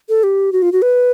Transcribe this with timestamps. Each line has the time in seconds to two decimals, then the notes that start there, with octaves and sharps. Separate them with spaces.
0.09 A4
0.23 G4
0.52 F#4
0.62 F4
0.72 F#4
0.82 B4